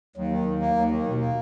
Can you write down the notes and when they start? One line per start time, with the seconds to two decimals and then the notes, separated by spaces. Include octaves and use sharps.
0.16 D#2 F#3
0.32 D#3
0.46 D#2
0.61 A#3
0.76 D#2
0.91 D#3
1.06 D#2 B2
1.20 A#3